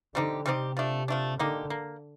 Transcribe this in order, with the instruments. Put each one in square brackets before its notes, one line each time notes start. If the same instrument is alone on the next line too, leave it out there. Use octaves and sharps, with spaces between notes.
[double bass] D3 [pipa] G3 C4 D#4 G4
[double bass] C3 [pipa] G3 C4 D#4 G4
[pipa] F3 A3 D4
F3 A3 D4
[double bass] D3 [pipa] A#3 D#4 G4
[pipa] A#3